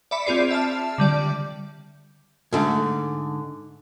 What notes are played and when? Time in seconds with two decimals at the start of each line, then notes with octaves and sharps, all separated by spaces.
0.11 D5 E5 B5 C#7
0.26 C4 F4 G#4 D5 C7
0.51 E5 A5 F6
0.98 D3 G3 D5
2.53 G#2 D3 A3